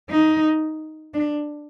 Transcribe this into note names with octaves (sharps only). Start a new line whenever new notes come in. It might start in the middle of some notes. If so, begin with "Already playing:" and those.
D#4
D4